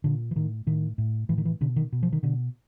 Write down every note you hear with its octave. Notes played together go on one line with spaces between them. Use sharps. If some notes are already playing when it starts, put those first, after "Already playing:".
A#2 D3
E3
A2 D#3
A2 D#3
A2
A2 E3
D#3
E3
B2 D3
D#3
B2
F3
D#3
B2 D3